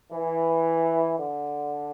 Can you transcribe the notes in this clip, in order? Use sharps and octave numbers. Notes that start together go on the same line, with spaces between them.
E3
D3